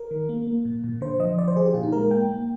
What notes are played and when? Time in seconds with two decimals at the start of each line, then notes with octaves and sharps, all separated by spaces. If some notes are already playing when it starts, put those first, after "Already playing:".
Already playing: A#4
0.11 D#3
0.29 A#3
0.47 A#3
0.65 A#2
0.84 A#2
1.01 D3 C5
1.20 F3 D#5
1.38 D3 D5
1.48 C5
1.56 D3 G#4
1.66 G4
1.74 A#2 F4
1.83 D#4
1.92 G#3 A#4
2.11 A#3 G5
2.28 A#3